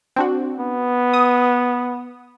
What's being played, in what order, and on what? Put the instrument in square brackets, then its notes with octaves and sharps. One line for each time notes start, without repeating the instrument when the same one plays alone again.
[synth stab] C4 D4 F#4
[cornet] B3
[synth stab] D#6